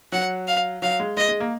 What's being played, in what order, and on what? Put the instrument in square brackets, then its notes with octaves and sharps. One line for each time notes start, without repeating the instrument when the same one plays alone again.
[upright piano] F#3 [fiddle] F#5
[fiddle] F5
[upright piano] F#3 [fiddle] F5
[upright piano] G#3
[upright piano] G#3 [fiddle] D#5
[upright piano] G#3
A#3